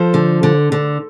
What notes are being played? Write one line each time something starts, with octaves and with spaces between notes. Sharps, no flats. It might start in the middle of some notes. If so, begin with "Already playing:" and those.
Already playing: F3 A4 C5
D3
D3
D3